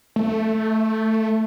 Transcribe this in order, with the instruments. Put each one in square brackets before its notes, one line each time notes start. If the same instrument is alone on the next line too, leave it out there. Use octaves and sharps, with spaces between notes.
[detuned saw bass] A3